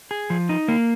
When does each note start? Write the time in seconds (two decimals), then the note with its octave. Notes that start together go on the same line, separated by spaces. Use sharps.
0.11 G#4
0.30 F3
0.49 D#4
0.68 A#3